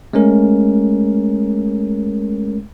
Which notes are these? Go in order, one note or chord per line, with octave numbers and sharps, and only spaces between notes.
G#3 A3 C#4 A#4